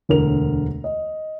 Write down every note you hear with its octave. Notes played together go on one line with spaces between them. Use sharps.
E1 D2 A#4 F7
D#5